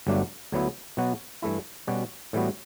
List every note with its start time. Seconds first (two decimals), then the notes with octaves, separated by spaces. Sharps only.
0.07 G1 G2 F#3 A3 D4
0.52 D2 D3 F#3 B3 E4
0.97 B2 F#3 B3 F#4
1.42 G2 E3 A3 E4
1.87 B2 G3 C#4 F#4
2.33 A2 E3 G3 B3 F#4